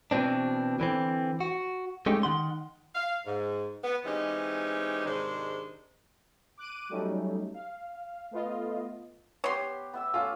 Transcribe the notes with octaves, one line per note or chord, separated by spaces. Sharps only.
B2 E3 C4 D4
D3 E3 C4
F#4
G#3 A3 C#4 D#4 G4
D#3 F#5 C6
F5
G#2
B3
E3 G#3 C4 C#4 D#4 G4
G#2 C3 D#3 G#3 D4 C5
D6 F#6 D7 D#7
F#3 G3 A3 C#4 D#4
F5
A3 B3 F4 D#5
B3 G4 C#5 C6
B3 E5 E6
A3 C#4 F4